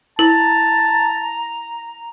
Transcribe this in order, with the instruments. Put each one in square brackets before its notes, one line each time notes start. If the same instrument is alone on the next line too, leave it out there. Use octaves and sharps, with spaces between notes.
[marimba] E4 [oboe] A5 [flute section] A#5